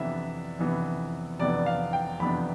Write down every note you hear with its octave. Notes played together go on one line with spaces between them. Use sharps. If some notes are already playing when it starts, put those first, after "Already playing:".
Already playing: F2 C3 E3 B3 D4 E5
F2 C3 E3 B3 D4
F2 C3 E3 B3 D4 D5
F5
G5
F2 C3 E3 B3 D4 B5